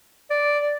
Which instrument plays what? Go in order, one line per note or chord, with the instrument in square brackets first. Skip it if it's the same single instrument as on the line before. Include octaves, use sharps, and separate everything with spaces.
[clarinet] D5